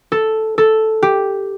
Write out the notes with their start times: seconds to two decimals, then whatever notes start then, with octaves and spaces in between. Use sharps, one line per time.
0.12 A4
0.58 A4
1.02 G4